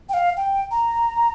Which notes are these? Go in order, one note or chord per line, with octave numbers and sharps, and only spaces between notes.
G5
F5
G5
A#5